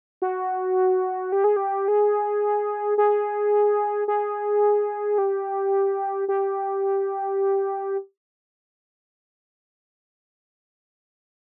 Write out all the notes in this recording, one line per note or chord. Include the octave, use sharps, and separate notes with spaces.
F#4
G4
G#4
G4
G#4
G#4
G#4
G4
G4